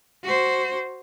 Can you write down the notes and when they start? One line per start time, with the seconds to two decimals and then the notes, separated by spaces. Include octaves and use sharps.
0.23 F#4 C5